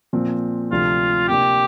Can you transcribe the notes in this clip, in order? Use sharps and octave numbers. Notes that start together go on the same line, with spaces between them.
A#2 F3 C4
D2 C3 F3 D4 F4
C3 A#3 D4 G4